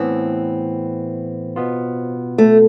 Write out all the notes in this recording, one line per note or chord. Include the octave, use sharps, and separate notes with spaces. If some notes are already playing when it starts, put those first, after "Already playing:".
Already playing: A2 E3 B3 C4
B2 B3 F4
A3